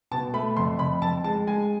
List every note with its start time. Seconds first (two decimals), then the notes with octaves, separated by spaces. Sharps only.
0.11 B2 A5
0.34 A3 B5
0.57 F2 C6
0.79 F2 B5
1.02 F2 A5
1.24 G#3 A5
1.47 G#3 G#5